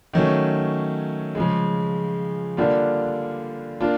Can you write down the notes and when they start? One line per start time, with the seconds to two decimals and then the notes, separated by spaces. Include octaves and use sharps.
0.13 D#3 F#3 A3 C#4
1.35 C#3 F3 G#3
2.57 D3 G3 A#3 D4 F4
3.80 A#3 D4 F4